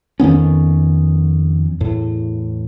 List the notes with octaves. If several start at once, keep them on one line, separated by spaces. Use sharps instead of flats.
F2 D#3 B3 C#4
E2 A2